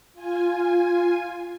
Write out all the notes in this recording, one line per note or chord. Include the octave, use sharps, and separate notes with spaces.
F4 G#5